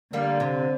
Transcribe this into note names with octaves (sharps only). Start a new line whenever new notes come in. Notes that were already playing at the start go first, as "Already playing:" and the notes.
D3 G3 A#3
C3